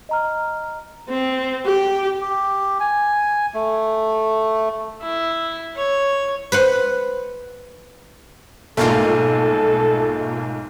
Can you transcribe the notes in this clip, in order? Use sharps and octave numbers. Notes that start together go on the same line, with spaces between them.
D#5 A#5 F6
C4
G4
G4
G#5
A3
E4
C#5
B4 C5 F#5
B1 G#2 A3 A#3 F4 A4